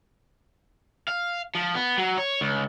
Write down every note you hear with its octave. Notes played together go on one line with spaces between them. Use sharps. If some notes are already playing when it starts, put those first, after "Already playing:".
F5
F3
B3
F#3
C#5
C#2